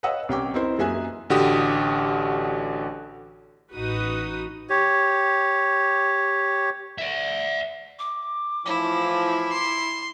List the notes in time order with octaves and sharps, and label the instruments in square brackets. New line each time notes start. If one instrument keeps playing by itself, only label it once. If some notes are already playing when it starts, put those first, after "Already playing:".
[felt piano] B4 C#5 D#5 F5 F#5 E6
C2 C#4 G5 D6
C4 D#4 E4 A#4 C5
F#2 A#3 G#4 E5 G#5 F#6
[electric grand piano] A1 D3 F#4 G4 D#6
[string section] A1 D#4 F#4 B4 D#6
[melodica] G4 C#5
[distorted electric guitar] D5 E5
[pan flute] D6
[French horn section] A2 E3 F3 [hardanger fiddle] E4
[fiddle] C6